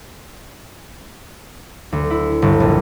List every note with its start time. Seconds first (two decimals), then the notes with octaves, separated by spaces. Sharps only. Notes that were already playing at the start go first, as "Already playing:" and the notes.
1.92 D2
2.11 E4
2.42 G1
2.60 A#1